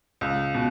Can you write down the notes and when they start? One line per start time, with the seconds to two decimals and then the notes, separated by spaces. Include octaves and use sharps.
0.21 C#2
0.54 B2